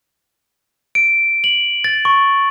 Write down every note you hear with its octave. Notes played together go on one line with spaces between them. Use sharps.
D7
F#7
A6
C#6